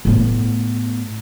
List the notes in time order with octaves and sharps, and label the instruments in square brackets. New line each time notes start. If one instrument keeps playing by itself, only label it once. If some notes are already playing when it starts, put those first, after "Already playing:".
[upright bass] A2 B3